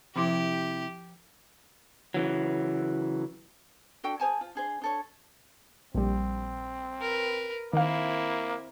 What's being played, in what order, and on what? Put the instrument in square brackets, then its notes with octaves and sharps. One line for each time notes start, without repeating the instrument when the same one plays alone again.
[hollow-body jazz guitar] C3 E4 [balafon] F3 C6 D6 [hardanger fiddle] G4
[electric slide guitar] C#3 E3 F#3
[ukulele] D4 F#4 A4 G5
G#4 C5 G#5 A5
F4
D4 G#4 C5
D4 A4 C#5
[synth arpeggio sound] A#1 G3 [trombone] C4
[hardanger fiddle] A#4 B4
[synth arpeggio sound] D#3 F5 [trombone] A#3 [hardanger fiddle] C4 E4